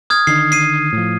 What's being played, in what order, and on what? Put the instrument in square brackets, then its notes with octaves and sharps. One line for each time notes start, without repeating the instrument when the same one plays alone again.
[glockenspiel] D#6 F6 G#6
[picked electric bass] D3 D#3 [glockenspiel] C7
[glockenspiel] C7 D#7
[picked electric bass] A2 F3